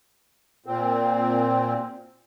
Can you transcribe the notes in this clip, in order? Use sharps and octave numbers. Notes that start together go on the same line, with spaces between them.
A#2 C4